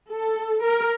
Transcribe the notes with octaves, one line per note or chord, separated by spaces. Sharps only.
A4
A#4